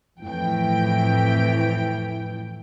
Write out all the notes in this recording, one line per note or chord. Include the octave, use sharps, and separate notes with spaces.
F2 A2 E3 G5